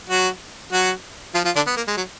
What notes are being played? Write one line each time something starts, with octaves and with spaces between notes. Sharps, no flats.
F#3 F#4
F#3 F#4
F3 F4
F3 F4
D3 D4
B3
A#3
G#3
F#3